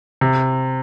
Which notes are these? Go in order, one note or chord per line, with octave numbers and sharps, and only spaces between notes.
C3